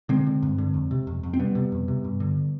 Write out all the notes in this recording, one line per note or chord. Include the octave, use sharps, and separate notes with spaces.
D3 G#3 C4
D3
G2
D3
F2
C3
F2
F2
C4
C3 G3 B3
C3
F2
C3
G2
D3